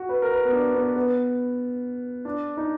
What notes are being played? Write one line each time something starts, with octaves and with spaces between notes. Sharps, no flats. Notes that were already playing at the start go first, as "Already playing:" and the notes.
Already playing: F#4
B4
A#4
B4
B3
D4
B3
B3
D4
D#4